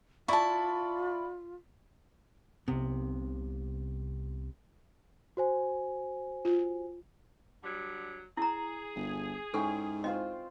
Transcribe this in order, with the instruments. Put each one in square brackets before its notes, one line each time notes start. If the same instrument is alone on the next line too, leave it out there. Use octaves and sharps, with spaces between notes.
[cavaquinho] E4 A5 [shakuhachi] F4 [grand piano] D5 B5 C#6
[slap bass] C2 B3 [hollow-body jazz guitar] C3
[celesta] F#4 C5 G#5
[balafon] F4
[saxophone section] D3 F#3 G3
[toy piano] E4 A#5 [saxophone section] G#4
[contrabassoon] G1
[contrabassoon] G#2 [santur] C#4 E4 G5 [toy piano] A4
[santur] C4 F4 C5 [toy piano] D#5